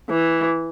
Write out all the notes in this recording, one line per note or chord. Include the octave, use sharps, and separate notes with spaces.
E3